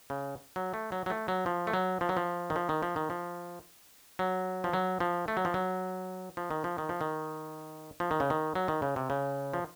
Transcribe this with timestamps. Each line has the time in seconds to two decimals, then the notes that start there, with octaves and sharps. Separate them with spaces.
0.10 C#3
0.56 F#3
0.74 A3
0.92 F#3
1.06 F#3
1.10 A3
1.28 F#3
1.46 F3
1.67 A3
1.73 F#3
2.01 F3
2.09 F#3
2.17 F3
2.50 D#3
2.56 F3
2.69 D#3
2.83 F3
2.96 D#3
3.10 F3
4.19 F#3
4.64 F3
4.73 F#3
5.00 F3
5.28 A3
5.37 F#3
5.45 F3
5.54 F#3
6.37 F3
6.51 D#3
6.64 F3
6.78 D#3
6.89 F3
7.01 D#3
8.00 F3
8.11 D#3
8.20 C#3
8.30 D#3
8.55 F#3
8.68 D#3
8.82 C#3
8.96 C3
9.10 C#3
9.54 F3